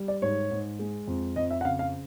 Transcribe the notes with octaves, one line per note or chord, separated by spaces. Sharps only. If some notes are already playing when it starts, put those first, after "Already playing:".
Already playing: G3
D5
G#2 C#5
G#2
G#3
F2
F2 D#5
E5
F#5
C#3 F5
F5